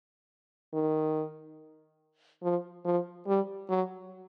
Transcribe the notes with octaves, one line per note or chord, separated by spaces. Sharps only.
D#3
F3
F3
G3
F#3